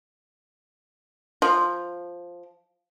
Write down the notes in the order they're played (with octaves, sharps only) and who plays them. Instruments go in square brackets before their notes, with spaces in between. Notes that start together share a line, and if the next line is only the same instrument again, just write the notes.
[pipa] F3